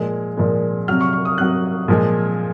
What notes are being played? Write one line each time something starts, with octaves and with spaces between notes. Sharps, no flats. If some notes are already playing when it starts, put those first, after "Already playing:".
Already playing: A#2 F3 G#3
A#2 F3 G#3
C3 F#3 F6
C#6
C#6
D#6
C3 F#3 F#6
A#2 F3 G#3